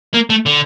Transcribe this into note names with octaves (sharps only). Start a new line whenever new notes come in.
A#3
A3
D3